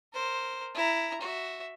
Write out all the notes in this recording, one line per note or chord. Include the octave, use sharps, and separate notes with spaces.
A#4 C5
E4 A#5
F#4 E5